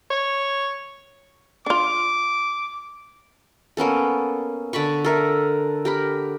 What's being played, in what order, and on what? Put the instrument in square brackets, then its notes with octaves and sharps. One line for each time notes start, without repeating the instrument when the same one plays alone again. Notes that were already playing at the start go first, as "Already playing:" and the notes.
[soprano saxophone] C#5
[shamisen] D4 F4 [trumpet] D6
[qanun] A#3 B3 C#4 A4
D3 A5 B5 C#6
A4 A#4 E5
G4 A#4 B5